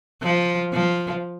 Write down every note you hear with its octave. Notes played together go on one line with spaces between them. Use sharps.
F3
F3